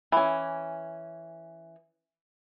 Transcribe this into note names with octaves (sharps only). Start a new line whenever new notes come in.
E3 C#4